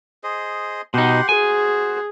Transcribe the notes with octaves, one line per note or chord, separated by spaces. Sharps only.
G#4 C5 D#5
B2 D#4 G4 F#5 C6
F#4 G#4 C5 G#5